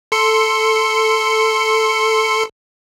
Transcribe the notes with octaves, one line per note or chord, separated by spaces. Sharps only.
A4 C6 C#7